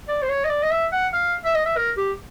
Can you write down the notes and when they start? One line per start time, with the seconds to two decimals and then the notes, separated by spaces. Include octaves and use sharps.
0.08 D5
0.22 C5
0.29 C#5
0.44 D#5
0.50 D5
0.63 D#5
0.71 E5
0.92 F#5
1.13 F5
1.45 E5
1.55 D#5
1.66 E5
1.77 A#4
1.97 G4